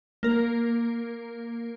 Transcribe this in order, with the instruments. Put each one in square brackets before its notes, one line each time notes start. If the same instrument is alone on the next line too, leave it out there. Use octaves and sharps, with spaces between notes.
[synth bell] A#3 A#4